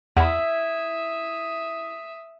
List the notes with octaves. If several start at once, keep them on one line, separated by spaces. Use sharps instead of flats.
E2 E4 E5 F#5 B5 D#6